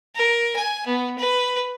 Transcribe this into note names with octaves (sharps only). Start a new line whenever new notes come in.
A#4
G#5
B3
B4